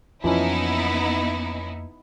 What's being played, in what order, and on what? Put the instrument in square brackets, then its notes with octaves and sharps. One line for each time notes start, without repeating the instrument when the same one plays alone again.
[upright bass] F2 A#3 [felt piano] E3 F3 C#4 [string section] B3 D#4 E4